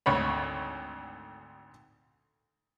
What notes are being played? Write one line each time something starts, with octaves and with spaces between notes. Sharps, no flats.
G#1 D2 C#5 B5